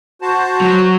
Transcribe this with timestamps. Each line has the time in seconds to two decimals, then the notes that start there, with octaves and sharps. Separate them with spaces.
0.22 F#4 C5 A5
0.61 F#3